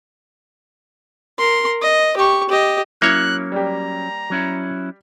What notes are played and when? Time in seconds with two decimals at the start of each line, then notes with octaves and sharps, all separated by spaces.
1.39 A#4 C6
1.82 D#5
2.17 G4 C#6
2.49 G4 D#5
3.02 F#3 A#3 C#4 E4 C#5 F#6
3.52 G3 G4 A#5
4.30 F#3 C#4 E4